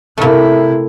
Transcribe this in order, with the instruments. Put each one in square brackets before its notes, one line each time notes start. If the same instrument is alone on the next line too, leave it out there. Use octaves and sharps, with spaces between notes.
[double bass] C3 E4 [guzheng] A3 A#3